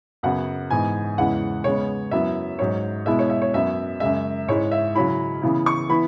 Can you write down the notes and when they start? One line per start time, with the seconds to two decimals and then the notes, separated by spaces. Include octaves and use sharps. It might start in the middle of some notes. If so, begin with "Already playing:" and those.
0.23 F#2 C#3 F#3 B3 F#5
0.70 G#2 E3 B3 G#5
1.18 E2 C#3 G#3 E4 F#5
1.64 C#3 G#3 B3 C#5
2.11 F#2 F#3 B3 E4 E5
2.59 G#2 F#3 C#4 C#5
3.06 B2 G#3 B3 E4 E5
3.19 C#5
3.30 E5
3.42 C#5
3.53 F#2 F#3 B3 E5
4.00 F#2 C#3 G#3 E5
4.48 G#2 G#3 C#4 E4 C#5
4.72 E5
4.95 C#3 F#3 C#4 E4 B5
5.42 C#3 E3 B3 E4
5.66 C#6
5.89 E3 B3 E4 B5